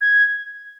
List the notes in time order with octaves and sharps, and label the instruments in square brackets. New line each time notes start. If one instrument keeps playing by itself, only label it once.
[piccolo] G#6